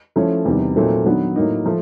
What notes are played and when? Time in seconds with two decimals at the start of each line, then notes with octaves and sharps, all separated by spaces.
0.16 F3 A3 C#4 E4
0.45 E2 C3 D#3 G3
0.75 A#2 F#3 A3 C4 D#4
1.05 D#3 F#3 B3 D4
1.36 A2 F#3 A#3 D#4
1.66 F3 A3